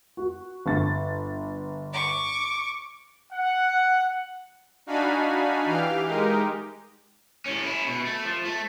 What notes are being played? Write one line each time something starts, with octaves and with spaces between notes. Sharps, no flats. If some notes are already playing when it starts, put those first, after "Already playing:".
F#4
G1 A6
C#6 D6
F#5
D4 D#4 F#4 F5 G#5 B5
E3 G4 F5 F6
G#3 D#4 G4 A#4
A2 C#4
C#4 E4
B2
A3
F3
A3